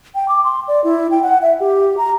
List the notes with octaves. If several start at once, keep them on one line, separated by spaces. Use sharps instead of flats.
G5
D6
C6
D5
E4
G5
F#5
E5
G4
A#5